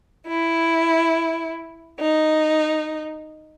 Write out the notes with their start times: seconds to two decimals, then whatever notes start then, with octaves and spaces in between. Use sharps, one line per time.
0.27 E4
2.00 D#4